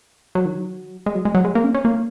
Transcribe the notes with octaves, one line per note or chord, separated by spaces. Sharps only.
F#3
D#3
F#3
G#3
F#3
G#3
F#3
G#3
A#3
C#4
C#4
A#3